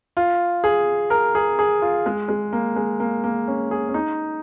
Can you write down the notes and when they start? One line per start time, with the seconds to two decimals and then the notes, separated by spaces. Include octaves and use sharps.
0.17 F4
0.64 G#4
1.10 A#4
1.35 G#4
1.59 G#4
1.82 F4
2.06 G#3
2.29 G#3
2.53 A#3
2.76 G#3
3.00 A#3
3.24 A#3
3.48 C#4
3.71 G#4
3.89 C#4
3.94 D#4